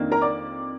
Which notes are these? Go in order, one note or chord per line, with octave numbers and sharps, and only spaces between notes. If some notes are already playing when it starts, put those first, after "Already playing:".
Already playing: F2 D#3 A#3 D4
A#4 A#5
D5 D6